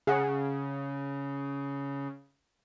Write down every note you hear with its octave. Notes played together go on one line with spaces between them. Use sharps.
C#3 G#4 F#5